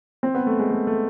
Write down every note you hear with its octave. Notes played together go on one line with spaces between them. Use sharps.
C4
B3
A3
G#3
A3
A3